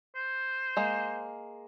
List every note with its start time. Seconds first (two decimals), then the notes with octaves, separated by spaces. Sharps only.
0.15 C5
0.77 G#3 A#3